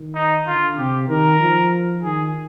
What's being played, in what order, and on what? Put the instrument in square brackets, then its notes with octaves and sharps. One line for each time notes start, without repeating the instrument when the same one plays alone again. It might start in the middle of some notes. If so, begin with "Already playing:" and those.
Already playing: [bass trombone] D#3
[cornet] D#4
[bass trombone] D3 [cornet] F4
[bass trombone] C3 [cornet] G4
[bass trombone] D#3 [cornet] A#4
[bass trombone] F3
[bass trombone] D#3 [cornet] G#4